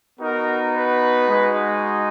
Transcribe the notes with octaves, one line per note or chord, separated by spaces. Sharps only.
B3 D#4 F#4 A#4
B4
G#3 D#4 F#4